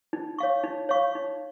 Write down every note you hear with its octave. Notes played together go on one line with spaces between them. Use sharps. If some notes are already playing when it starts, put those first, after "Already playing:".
D#4
C#5 F5 C#6
D#4
C#5 F5 C#6
D#4